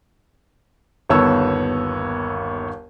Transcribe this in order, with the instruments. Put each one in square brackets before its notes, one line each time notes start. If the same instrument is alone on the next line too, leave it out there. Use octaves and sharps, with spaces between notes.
[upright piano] G1 D#2 B3 C#5 A5 E6